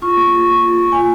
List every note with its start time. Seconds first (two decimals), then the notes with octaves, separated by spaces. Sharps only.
0.02 F4 C#6
0.17 A#3
0.33 A#3
0.48 F4
0.62 A#3
0.78 A#3
0.92 A#3 G#5